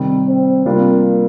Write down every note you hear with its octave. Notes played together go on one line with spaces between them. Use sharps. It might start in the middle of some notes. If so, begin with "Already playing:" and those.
Already playing: C3 D#3 G3
C4
C3 G3 A#3 D4 F4